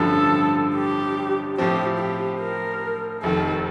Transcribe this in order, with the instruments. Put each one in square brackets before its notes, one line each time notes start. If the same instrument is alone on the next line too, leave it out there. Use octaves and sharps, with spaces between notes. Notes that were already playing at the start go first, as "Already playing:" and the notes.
Already playing: [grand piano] A1 G2 D3 F3 [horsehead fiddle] A4
[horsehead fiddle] G4
[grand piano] A2 F3 C4 [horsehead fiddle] G4
[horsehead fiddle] G4
A#4
[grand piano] F1 F2 D#3 [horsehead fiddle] A4